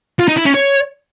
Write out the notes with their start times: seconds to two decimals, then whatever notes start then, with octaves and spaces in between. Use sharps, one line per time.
0.19 F4
0.28 D#4
0.37 E4
0.46 C#4
0.54 C#5